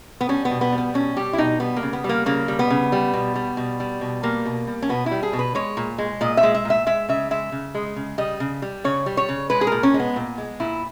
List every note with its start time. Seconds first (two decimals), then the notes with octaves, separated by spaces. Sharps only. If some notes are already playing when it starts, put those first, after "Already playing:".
0.21 B3
0.29 G3 C#4
0.45 B3
0.51 B2
0.61 B3
0.72 G3
0.78 B3
0.94 B2 C#4
1.16 G3 G4
1.33 E4
1.38 B2 D#4
1.60 G3 B3
1.76 A#3
1.83 C#3
1.93 B3
2.04 G3
2.09 A#3
2.26 C#3 A#3
2.48 G3
2.59 B3
2.70 C#3
2.92 G3
3.13 B2
3.36 G3
3.57 B2
3.80 G3
4.01 B2
4.23 G3 A#3
4.45 B2
4.67 G3
4.82 C#4
4.89 B2 B3
5.06 E4
5.11 G3
5.23 G#4
5.33 B2
5.39 B4
5.55 G#3 C#5
5.77 A#2
5.98 G#3
6.21 A#2 D#5
6.37 E5
6.43 G#3
6.54 E5
6.65 A#2
6.70 E5
6.86 G#3 E5
7.09 C#3 E5
7.31 G#3 E5
7.52 C#3
7.75 G#3
7.96 C#3
8.18 G3 D#5
8.40 C#3
8.62 G3
8.84 C#3 C#5
9.06 G3
9.17 C#5
9.29 C#3
9.50 G#3 B4
9.61 G#4
9.67 A#2 A#4
9.83 C#4
9.94 G#3
10.00 B3
10.16 A#2
10.38 G#3
10.60 A#2 E4